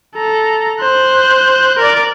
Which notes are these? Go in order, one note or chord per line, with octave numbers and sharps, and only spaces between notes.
A4 A#5
C5 F#6
A#4 D5